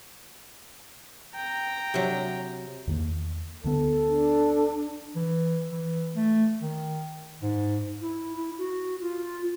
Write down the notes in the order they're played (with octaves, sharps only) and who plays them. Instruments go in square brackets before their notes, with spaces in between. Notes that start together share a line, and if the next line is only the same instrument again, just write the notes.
[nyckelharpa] G5 A#5
[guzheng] C3 F#3
[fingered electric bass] E2 D#3 A#3
[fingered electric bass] D2 D3 B3 [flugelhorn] A4
[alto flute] D4
[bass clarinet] E3
E3
A3
D#3
G#2
[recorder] E4
E4
F#4
F4